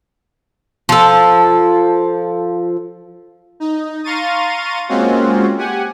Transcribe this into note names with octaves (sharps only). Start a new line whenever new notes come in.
F3 A4
D#4
F5 A#5 C6 C#6 A6 D#7
G#3 A#3 C4 C#4 F4 F#4
G4 F#5 G#5